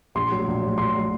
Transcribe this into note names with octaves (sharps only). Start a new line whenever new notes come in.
A#1 C6
A2 F#3
A#1
A2 F#3
A#1 C6
A2 F#3